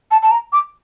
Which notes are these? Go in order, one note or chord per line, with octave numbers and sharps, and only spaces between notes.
A5
A5
A#5
D6